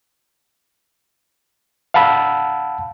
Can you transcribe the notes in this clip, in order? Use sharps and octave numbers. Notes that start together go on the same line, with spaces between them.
F5 F#5 A5 B5 E6